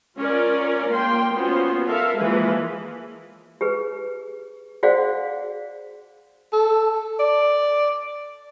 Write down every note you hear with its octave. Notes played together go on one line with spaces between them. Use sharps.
C#4 F4 A#4 D5
A#3 G5 C6
B3 C#4 F4 F#4 C5
A4 A#4 E5 F5
E3 F3 G#3 A#3 G#4 B4
G4 G#4 B4
F#4 G#4 C5 D5 F5 F#5
A4
D5